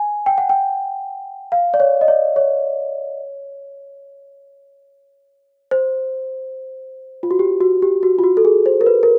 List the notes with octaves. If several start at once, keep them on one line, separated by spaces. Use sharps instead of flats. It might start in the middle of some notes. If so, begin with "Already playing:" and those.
Already playing: G#5
G5
F#5
G5
F5
D5
C#5
D#5
D5
C#5
C5
F4
F#4
G4
F#4
G4
F#4
F4
F#4
A4
G#4
C5
A#4
B4
A#4